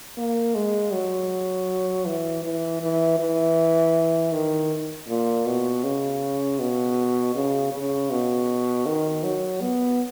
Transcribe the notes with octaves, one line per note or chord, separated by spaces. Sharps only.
A#3
G#3
F#3
E3
E3
E3
E3
D#3
A#2
B2
C#3
B2
C#3
C#3
B2
D#3
F#3
B3